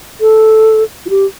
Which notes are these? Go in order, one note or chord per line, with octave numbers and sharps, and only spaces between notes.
A4
F4
G4